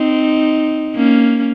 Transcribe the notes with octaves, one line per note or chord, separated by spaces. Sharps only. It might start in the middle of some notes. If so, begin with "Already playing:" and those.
Already playing: C4 D#4
A#3 C#4